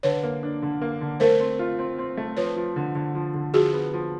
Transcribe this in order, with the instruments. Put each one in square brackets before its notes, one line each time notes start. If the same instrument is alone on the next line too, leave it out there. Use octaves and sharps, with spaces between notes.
[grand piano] D3 [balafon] B4 C#5
[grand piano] A#3
D4
D3
A#3
D3
[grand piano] A3 [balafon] A#4 C5
[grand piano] C4
F4
C4
C4
A3
[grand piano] F3 [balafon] B4 C#5
[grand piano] F3
D3
D3
F3
D3
[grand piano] F3 [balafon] F#4 G#4
[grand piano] B3
F3